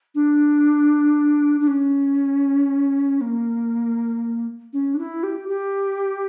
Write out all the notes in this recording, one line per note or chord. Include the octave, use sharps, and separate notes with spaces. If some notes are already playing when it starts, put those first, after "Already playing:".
D4
D4
C#4
A#3
C#4
D4
E4
G4
G4